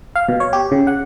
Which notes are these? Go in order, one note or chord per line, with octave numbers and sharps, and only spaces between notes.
F5
B2
C#5
G4
C#3
F#5